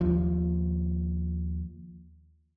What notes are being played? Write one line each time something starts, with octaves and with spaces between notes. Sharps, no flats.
D#2 F3